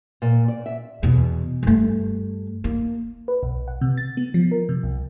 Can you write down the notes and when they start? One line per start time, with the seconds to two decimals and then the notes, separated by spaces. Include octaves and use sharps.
0.22 A#2
0.48 D5
0.66 E5
1.03 E2 B2
1.63 G2 A3
2.64 A#3
3.28 B4
3.43 B1
3.68 F#5
3.81 C3
3.98 A6
4.17 B3
4.34 F3
4.51 A#4
4.69 C3
4.83 C2